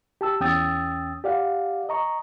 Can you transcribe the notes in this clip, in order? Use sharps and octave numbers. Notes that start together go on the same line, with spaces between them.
G4 A5 E6
E2 C#4 G5 D#6 E6 A6
G4 D5 F5 F#5
D#5 A#5 C#6